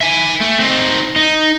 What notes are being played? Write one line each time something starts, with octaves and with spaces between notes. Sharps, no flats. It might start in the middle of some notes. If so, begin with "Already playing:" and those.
E5 G#5
A3
C4 D#4
D#4